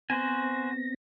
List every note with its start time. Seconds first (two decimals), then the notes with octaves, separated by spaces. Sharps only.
0.10 B3 C4 F#4 C5 G#5 A#6